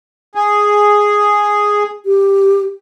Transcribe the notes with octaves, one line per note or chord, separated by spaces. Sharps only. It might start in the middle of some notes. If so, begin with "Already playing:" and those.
G#4
G4